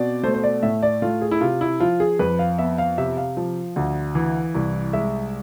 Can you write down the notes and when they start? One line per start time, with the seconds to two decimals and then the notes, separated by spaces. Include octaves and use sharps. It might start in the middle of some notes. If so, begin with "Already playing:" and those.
Already playing: B2 C4 D5
0.23 A3 C5
0.34 C5
0.43 D5
0.63 A2 E5
0.83 D5
1.02 A3 F4
1.22 G#4
1.31 E4
1.41 C3 F4
1.61 E4
1.80 F3 F4
2.00 G#4
2.19 F2 B4
2.39 F5
2.59 B3 E5
2.78 F5
2.98 C3 E5
3.17 F5
3.37 F3
3.76 D2
4.15 E3
4.54 C2
4.93 G#3 E5